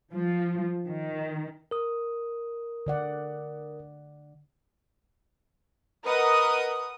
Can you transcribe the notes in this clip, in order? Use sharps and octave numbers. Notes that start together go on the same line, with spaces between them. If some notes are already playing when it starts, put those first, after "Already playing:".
F3
D#3
A#4 D#6
D3 D5 F#5
A#4 B4 D#5 F#5 D#6